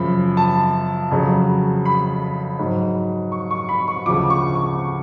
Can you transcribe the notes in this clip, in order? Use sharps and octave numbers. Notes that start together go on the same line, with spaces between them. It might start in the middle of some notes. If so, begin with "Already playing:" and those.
Already playing: F#2 C#3 F3 B5
A5
F2 C#3 F#3
B5
G#2 F#3
C#6
C#6
B5
C#6
D2 C#3 F3 D6
C#6
C#6